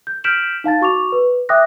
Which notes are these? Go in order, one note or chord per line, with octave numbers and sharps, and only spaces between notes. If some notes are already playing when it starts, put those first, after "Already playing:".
G6
F6 G6 B6 D7 E7 F#7
D#4 F5 A5 A6
F#4 C#6 D6 F7
B4
E5 G5 D6 D#6 F#6 A#6